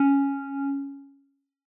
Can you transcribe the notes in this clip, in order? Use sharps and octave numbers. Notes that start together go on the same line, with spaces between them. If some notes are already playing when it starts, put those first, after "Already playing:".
Already playing: C#4